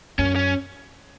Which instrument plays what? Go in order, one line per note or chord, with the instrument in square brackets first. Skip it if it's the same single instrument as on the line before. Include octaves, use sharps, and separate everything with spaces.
[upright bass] F#2 [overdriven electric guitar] C#4
[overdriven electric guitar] C#4